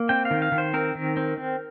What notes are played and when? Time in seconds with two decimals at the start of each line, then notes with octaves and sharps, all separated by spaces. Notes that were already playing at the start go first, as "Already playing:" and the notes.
Already playing: A#3
0.09 C4 G5
0.25 F5
0.31 D#3
0.42 F5
0.52 D#3
0.58 C5
0.74 C4 A#4
0.95 D#3
1.17 C4
1.37 C4